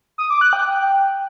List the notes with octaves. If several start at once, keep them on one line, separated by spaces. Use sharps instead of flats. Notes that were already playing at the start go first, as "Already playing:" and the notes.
D#6
D6
F#6
G5